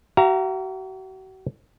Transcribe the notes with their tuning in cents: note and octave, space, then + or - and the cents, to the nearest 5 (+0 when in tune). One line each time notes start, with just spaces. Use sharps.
F#4 +40 F5 -40 A#5 +0